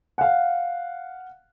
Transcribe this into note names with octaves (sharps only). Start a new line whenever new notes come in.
F5 F#5